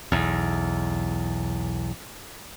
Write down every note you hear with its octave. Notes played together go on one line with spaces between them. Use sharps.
B1 E2